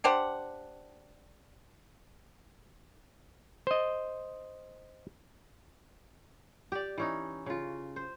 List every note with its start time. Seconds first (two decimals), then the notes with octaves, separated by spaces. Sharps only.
0.04 D4 G4 C5 F#5
3.67 C5 D#5
6.72 G4 D5
6.98 E3 C#4 D#4
7.46 C#3 F4
7.96 C5